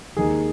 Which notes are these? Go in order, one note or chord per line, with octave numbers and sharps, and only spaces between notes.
D#2 D#3 G#3 G#4